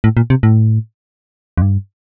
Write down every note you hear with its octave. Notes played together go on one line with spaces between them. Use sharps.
A2
A#2
C3
A2
F2
G2